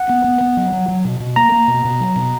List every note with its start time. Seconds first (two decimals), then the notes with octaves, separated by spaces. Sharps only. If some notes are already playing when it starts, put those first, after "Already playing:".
Already playing: F#5
0.09 B3
0.24 B3
0.41 B3
0.57 F#3
0.72 F#3
0.88 F#3
1.05 B2
1.20 B2
1.36 A#3 A#5
1.52 A#3
1.68 B2
1.85 B2
2.00 F#3
2.16 B2